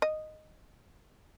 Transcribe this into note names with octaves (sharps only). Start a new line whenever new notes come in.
D#5